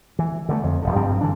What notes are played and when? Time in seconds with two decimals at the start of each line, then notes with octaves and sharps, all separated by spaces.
0.19 E3
0.49 D3 G3 A3
0.64 F2
0.82 D#1 G#1 D3
0.96 G2 F3 C4
1.21 D3 E3 D4